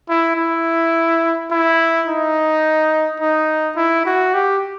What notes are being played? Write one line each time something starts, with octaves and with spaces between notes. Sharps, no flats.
E4
E4
E4
D#4
D#4
E4
F#4
G4